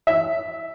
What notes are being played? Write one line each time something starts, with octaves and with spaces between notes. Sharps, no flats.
E5